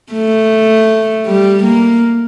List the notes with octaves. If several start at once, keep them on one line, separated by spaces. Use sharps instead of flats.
A3
G3
A#3